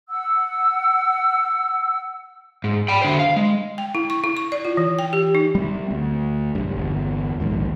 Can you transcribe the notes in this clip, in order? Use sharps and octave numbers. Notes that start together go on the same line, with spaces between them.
F#5 E6
G#2
G5 B5
D3 C5
F5
G#3
G5
E4
C#6
E4
C#6
D5
F4
E3
G5
G4
D#4
G3 C4
D2
B1 G2
G1 E2
A#1 D#2 G#2